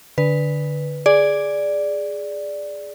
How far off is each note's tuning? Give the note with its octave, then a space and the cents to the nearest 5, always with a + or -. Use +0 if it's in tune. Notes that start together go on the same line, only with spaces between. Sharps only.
D3 +0 B4 +0
G#4 +0 D5 +0